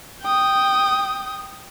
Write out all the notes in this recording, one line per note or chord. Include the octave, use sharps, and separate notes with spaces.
G5 D#6